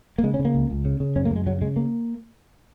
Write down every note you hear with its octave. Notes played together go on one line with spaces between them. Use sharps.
A#3
C#3 G#3
C#4
C#3
A#3
C#2
C#2
C#3
C#3
F#2 C#4
A#3
F#2 G#3
C#3 F#3
C#3 G#3
A#3